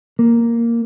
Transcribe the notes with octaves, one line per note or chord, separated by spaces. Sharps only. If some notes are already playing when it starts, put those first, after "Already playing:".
A#3